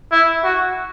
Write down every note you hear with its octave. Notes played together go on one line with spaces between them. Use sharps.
E4
F#4